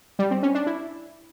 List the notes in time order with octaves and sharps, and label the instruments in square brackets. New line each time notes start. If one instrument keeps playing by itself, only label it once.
[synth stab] G3
C4
C#4
D4
E4